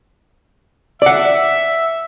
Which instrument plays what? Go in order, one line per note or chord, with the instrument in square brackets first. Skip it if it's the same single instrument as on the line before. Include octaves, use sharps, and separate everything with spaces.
[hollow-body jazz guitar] D5 F#5 [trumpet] E5